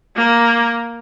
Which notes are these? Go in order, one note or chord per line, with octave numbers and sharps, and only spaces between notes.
A#3